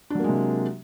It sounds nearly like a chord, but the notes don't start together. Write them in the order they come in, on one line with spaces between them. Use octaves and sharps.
D4 F#3 A#3 G#3 C3